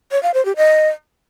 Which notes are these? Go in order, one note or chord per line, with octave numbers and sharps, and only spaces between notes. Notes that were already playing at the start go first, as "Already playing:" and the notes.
C#5
F5
C5
G4
D#5